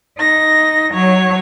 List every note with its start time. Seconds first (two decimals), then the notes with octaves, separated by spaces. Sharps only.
0.18 D#4 A#6
0.92 F#3 C#5